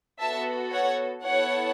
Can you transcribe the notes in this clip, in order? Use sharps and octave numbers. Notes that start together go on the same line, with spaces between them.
B3 F#4 A4 E5 A5
C#5 F#5
B3 E4 A4 C#5 F#5